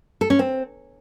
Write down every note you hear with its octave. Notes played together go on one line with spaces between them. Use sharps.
A4
C#4
C4